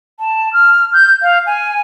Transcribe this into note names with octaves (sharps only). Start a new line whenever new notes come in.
A5
F6
G6
F5
G#5